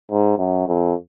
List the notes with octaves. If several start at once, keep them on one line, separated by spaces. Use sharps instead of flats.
G#2
F#2
F2